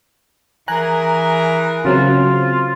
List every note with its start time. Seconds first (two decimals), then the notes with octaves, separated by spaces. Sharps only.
0.68 E3 G#4 A#4 G#5 A#5 F#6
1.85 C#3 F#3 C4 F4